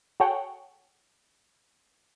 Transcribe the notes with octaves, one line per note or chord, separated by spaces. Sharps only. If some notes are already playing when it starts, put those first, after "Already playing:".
F#4 G#4 A4 C#5 F#5 G5